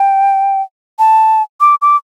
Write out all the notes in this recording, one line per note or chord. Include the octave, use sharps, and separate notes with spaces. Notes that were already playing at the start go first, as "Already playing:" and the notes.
Already playing: G5
A5
D6
D6